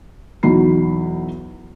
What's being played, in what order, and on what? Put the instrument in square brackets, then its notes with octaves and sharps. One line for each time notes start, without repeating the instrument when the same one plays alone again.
[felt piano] B1 E2 F#3 D#4 B5 C7